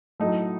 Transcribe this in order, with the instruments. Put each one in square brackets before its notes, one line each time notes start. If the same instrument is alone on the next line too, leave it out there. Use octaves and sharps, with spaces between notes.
[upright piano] A2 F#3 A3 D#4